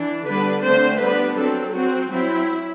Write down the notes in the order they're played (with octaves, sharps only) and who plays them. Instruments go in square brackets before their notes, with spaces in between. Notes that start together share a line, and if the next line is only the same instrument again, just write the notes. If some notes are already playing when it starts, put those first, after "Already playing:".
Already playing: [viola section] E3 D4
D3 G3 B3 D4 B4
D3 A3 C4 C5
G3 B3 D4 B4
F#3 C4 A4
F#3 C4 F#4
F#3 C4 E4